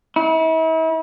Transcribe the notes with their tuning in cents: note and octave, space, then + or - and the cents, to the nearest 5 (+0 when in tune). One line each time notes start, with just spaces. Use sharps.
E4 -40